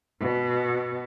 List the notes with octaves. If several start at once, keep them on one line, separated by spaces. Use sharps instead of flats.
B2